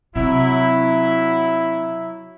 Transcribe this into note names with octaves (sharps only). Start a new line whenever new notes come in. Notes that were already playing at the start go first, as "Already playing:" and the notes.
C3 F#3 E4